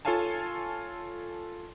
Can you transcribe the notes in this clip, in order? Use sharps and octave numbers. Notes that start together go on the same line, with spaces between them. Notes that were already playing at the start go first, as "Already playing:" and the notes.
F4 A4 C#5 F5 G#5 A5